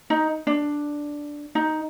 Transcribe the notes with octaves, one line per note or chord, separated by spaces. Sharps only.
D#4
D4
D#4